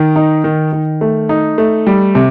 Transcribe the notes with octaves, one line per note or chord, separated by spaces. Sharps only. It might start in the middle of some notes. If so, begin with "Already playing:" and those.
Already playing: D#3
D#4
D#3
D#3
A3
D#4
A3
G3
C3